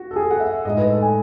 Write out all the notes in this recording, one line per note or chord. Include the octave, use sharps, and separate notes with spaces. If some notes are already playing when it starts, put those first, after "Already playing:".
Already playing: F#4
A4
G#4
F#5
E5
A2 G#3 D#4 D#5
B4
A4
G#5